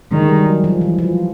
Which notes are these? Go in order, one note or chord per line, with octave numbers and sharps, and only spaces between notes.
D#3 G#3
G3
F#3
F3
E3
F3